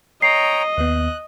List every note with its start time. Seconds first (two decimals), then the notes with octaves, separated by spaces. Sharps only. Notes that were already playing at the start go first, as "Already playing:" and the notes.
0.22 C#5 D#5 G5 A#5 C7
0.77 D#2 B3 F#6